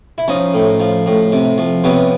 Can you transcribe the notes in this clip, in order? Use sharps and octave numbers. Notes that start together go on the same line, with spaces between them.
E4
F3 C#4 D#4
A2
F3
A2
C3
F3
C3 B3 C#4